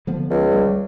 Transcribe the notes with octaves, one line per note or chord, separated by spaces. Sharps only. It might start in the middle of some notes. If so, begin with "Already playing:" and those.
D3 F3 B3
C#2
G3